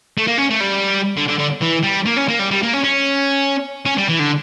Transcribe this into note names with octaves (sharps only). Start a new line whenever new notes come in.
A3
A#3
C#4
A3
G3
D3
D3
D3
E3
G3
A#3
C#4
A#3
G3
G3
A#3
C#4
C#4
C#4
G3
E3
D3